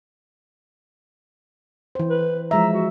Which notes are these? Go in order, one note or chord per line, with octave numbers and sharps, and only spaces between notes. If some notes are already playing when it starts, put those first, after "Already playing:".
E3 C5
B4
F3 G#3 E5 A#5
F#4